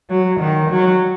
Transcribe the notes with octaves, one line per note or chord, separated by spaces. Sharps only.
F#3
D#3
F#3